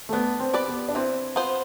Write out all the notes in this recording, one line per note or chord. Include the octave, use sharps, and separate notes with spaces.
A3
B3 D4
C4
G4 B4 D5
B3
D4
E3 C4
B3 F4 C5